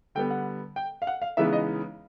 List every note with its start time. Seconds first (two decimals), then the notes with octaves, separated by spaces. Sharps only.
0.15 D3 G3 B3 G5
0.31 F#5
0.76 G5
1.02 F5
1.07 F#5
1.22 F5
1.37 C#3 E3 G#3 B3 D#4 E5
1.53 D#5